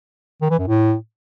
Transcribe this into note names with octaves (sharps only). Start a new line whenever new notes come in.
D#3
E3
F#2
A2